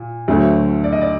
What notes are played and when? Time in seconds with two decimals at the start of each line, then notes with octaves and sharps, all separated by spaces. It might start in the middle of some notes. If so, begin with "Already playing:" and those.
Already playing: A#2
0.28 D2 D3 F#3 A3
0.84 D5
0.92 D#5
1.01 D5